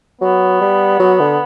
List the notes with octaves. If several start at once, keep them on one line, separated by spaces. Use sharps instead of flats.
F#3 B3
G3
F#3
D3